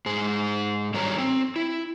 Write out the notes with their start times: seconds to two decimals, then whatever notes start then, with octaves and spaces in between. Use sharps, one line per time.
0.06 G#2 G#4
0.94 G2 D#3 F#3 A4 C#5 A#5
1.18 C4
1.56 E4